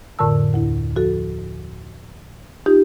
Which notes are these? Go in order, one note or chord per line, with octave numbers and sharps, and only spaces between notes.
F2 A2 D3 A#4 A5 E6
D2 E4
F3 F#4 A4
D#4 F4 G4